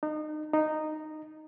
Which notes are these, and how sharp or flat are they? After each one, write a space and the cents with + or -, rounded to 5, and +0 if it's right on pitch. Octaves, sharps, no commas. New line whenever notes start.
D#4 -30
D#4 -10